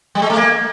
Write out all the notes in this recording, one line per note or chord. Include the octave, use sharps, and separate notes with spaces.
G3
G#3
A3
A#3